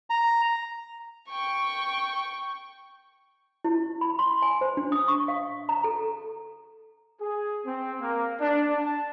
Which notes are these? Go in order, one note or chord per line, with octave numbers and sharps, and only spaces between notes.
A#5
G5 C#6
E4
B5
C6
G#5
C5
D4
D#6
C#6
F5
A#5
A4
G#4
C4
A#3
D4
A5